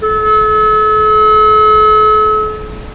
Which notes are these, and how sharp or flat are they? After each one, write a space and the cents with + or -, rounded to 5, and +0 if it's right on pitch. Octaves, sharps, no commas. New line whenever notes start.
A4 -40